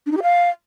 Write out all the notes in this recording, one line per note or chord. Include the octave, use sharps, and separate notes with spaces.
D4
D#4
G4
F5